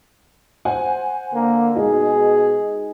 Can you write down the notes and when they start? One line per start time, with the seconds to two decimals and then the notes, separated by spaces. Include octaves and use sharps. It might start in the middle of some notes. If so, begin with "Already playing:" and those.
0.65 C5 F#5 G#5
1.33 D3 A#3
1.76 B2 G#3 D#4 G#4